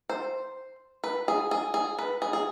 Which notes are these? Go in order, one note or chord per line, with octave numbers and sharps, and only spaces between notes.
C5
B4
G#4
G#4
G#4
B4
G#4
G#4